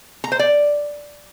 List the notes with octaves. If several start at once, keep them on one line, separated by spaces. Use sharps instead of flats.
A#5
C5
D5